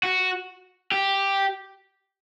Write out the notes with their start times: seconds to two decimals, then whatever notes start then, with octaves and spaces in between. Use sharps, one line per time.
0.03 F#4
0.92 G4